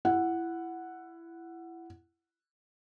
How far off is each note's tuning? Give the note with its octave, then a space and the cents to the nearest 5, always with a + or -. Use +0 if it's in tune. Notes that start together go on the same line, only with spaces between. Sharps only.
E4 +20 F#5 +0